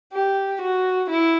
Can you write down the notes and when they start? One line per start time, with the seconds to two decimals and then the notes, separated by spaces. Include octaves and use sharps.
0.13 G4
0.61 F#4
1.09 E4